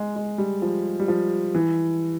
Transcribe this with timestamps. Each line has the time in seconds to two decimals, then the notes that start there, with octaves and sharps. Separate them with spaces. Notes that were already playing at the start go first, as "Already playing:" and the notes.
Already playing: G#3
0.16 G#3
0.38 G3
0.62 F3
0.99 G3
1.08 F3
1.55 E3